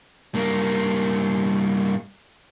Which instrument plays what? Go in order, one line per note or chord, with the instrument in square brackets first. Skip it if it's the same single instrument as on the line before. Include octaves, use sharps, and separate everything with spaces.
[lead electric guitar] G2 A#3